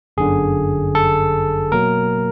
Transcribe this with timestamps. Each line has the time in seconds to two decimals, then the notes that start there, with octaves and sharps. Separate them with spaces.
0.17 G1 F#2 D3 G#4
0.95 A4
1.72 B2 F#3 A#3 A#4